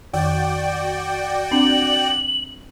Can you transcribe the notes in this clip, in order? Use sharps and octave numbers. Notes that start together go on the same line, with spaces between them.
F2 D#3 F#4 D5 G5
C4 D4 F#7